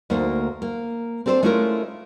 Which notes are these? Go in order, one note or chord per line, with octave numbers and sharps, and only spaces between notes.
D2 A#3 D#4 C5
A#3
C4 D4 A4 B4 C5
G#3 A3 C#4 E4 F4 A#4